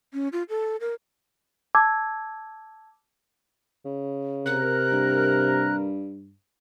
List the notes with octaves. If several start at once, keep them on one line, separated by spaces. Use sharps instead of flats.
C#4
F4
A4
A#4
A5 D6 E6 G#6
C#3
C3 G4 A#4 F#6
G2